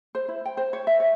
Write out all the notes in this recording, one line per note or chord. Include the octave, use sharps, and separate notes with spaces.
C5
E4
G5
C5
C#5
E5
C#5